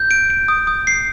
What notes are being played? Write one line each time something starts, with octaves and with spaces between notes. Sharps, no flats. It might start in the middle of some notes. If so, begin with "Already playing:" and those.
Already playing: G6
D7
D7
D#6
D#6
C7